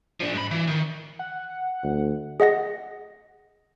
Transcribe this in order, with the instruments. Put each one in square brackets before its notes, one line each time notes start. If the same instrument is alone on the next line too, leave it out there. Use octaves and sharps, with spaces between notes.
[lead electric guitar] F3 D4
G#2 B5
E3
D#3
[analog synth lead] F#5
[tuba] D2
[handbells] G#4 D#5 F#5 A#6